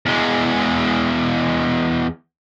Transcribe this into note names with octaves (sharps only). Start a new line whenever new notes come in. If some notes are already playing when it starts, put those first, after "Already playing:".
E2 G#3